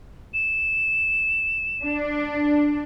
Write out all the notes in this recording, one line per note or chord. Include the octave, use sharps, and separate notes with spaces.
E7
D4